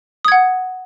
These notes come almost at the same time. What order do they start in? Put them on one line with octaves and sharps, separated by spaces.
D#6 G#6 F#5